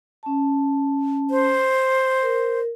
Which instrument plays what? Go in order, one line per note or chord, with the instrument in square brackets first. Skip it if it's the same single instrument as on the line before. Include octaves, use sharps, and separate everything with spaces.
[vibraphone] C#4 A5
[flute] C5
[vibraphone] A#4